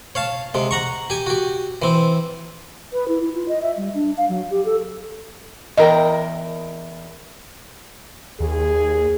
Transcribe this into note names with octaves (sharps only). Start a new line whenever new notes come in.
C#5 F5 A5
C3 G#3
F#5 A#5 C#6
G4 G#5
F#4 G4
E3 C4
B4
E4
E4
F4
D#5
E5
G3
D4
F5
F#3
G4
A4
E2 A#4 D#5 G5
D#2 G#4